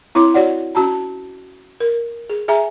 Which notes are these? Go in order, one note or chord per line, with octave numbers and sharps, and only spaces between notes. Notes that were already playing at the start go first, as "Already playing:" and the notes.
C4 E4 C#5 C6 D6
F#4 C#5 D5 F#5
C#4 F#4 A5 A#5
A#4
G#4
G#4 E5 G#5 A#5